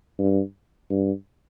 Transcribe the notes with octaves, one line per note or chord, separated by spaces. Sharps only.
G2
G2